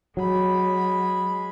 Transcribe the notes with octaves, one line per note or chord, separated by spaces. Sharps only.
F#3 G#3 B5